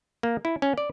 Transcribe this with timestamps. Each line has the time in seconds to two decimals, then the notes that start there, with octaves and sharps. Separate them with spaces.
0.23 A#3
0.45 E4
0.62 C#4
0.78 D5